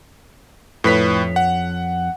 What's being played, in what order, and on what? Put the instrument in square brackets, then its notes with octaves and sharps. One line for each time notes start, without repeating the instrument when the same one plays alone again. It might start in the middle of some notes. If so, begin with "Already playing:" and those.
[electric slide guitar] F2 C#5 [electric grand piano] A2 B4 B6
[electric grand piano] F#5